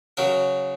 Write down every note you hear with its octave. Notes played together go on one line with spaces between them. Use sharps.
C#3 F#3 A#4